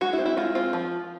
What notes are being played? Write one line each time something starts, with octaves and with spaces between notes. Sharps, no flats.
G#3 F#4
E4
C4
E4
G#3 F4
C4 F4
F3